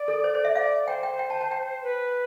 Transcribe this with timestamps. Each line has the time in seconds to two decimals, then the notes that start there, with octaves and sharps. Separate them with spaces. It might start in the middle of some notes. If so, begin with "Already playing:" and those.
Already playing: D5
0.08 A4
0.24 C5
0.35 C5
0.45 E5
0.55 D5 F5
0.87 C5 G5
1.03 G5
1.19 G5
1.30 A5
1.41 A5
1.51 G5
1.83 B4